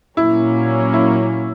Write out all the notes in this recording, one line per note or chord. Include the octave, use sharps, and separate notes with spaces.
A#2 F#3 A#3 C#4 E4
E4